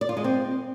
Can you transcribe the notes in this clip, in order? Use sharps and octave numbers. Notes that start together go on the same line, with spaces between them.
D5
F4
G#3
C4